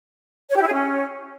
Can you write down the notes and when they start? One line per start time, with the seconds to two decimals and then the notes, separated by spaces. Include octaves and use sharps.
0.50 C#5
0.56 G4
0.61 E4
0.67 G#4
0.72 C#4